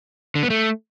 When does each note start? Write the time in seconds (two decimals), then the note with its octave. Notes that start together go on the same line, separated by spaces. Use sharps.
0.35 D3
0.43 B3
0.50 A3